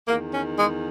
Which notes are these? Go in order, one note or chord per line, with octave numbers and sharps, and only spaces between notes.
E2 D#3 A#3
C#4
G#3